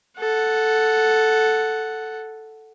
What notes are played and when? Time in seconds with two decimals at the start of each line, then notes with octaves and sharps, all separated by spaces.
0.20 A4 F#5